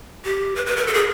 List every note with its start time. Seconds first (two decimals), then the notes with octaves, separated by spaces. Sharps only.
0.24 G4
0.56 B4
0.66 B4
0.76 A#4
0.87 A4
0.94 G#4